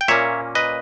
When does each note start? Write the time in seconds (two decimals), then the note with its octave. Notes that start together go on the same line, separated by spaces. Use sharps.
0.01 G5
0.08 A#2 A#3 C#4 C#5 E5
0.55 B4 D#5